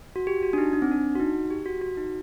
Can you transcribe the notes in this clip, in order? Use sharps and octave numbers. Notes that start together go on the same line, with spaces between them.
F#4
G4
F#4
D4
D#4
D4
C4
D4
F#4
D#4
G4
F#4
F#4
D#4